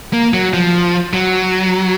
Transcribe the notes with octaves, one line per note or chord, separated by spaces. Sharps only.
A#3
F#3
F3
F#3